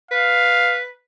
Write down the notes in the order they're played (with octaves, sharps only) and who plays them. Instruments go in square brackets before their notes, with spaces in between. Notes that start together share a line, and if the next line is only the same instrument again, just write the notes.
[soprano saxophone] B4 [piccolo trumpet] F5